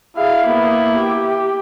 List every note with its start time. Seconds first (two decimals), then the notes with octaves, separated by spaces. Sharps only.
0.17 E4 G#4 F5
0.46 A#3 B3
0.97 G4